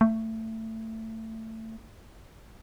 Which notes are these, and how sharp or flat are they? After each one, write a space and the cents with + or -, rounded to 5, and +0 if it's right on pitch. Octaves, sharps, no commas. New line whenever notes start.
A3 +20